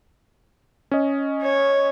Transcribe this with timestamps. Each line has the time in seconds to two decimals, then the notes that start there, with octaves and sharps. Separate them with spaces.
0.92 C#4 D#5
1.42 C#5